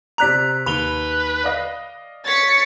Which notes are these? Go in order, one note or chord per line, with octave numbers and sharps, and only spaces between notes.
C3 D5 A#5 F#6 B6 F7
D#2 B4 B5 F7 G7
D5 D#5 F5
C#5 A6 B6 C#7